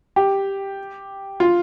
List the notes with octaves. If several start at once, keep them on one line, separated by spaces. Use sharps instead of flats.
G4
F4